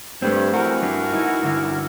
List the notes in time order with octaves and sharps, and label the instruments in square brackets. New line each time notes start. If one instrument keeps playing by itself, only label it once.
[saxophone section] G2 [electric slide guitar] A3 C4
[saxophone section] E3 F#4 A#4
[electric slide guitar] G2 G3 D4
D#4 E4
G2 D3 E4